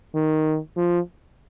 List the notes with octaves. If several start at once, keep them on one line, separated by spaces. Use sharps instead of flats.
D#3
F3